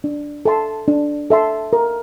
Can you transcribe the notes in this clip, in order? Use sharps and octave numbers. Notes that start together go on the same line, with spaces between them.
D4
A4 E5 A5 C6
D4
A4 E5 A5 C6
A#4